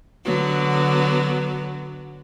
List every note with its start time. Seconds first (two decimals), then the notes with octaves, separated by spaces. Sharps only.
0.24 D3 F#3 B3